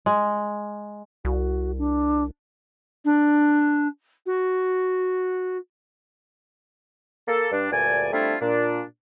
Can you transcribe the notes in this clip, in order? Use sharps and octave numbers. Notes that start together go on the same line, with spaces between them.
G#3
C2 F#4
D4
D4
F#4
A#3 A4
G2 D4
D2 G2 A#2 D5 G#5
G3 A3 C4 D4 E4 F4
A#2 D4